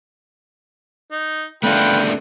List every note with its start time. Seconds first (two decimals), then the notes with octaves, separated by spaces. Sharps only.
1.12 D#4
1.63 A3 B3 D4 F4 B4 G5